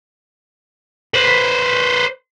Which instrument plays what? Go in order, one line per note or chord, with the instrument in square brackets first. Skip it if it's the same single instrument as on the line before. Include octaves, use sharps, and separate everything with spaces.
[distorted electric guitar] B4 C5